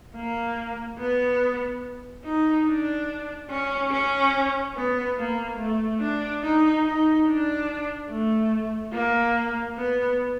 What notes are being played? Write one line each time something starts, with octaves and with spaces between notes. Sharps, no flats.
A#3
B3
D#4
D4
C#4
C#4
B3
A#3
A3
D4
D#4
D#4
D4
A3
A#3
B3